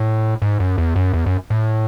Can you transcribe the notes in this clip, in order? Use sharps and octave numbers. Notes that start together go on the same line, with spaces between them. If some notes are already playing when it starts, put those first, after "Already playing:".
Already playing: A2
G#2
F#2
E2
F#2
E2
F#2
A2